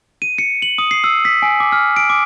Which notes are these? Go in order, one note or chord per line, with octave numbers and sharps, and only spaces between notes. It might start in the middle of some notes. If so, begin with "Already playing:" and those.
D#7
C#7
F#7
D#6
C7
E6
B6
G#5
D6
F6
D7
D6